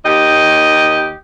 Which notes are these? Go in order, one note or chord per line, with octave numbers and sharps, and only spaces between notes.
D#2 G4 D#5